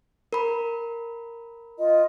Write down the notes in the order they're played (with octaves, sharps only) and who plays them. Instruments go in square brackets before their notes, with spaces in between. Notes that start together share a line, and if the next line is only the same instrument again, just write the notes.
[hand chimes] A#4 B5
[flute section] F4 D#5